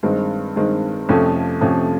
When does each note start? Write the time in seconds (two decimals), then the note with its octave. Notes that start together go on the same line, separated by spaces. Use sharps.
0.03 G2 D#3 G#3 C4
0.56 G2 D#3 G#3 C4
1.09 F2 C3 F3 A3 C#4
1.61 F2 C3 F3 A3 C#4